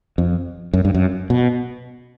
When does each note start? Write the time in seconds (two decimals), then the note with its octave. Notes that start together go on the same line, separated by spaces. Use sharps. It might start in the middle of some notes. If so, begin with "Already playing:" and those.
0.18 F2
0.73 F#2
0.85 G2
0.94 F#2
1.30 B2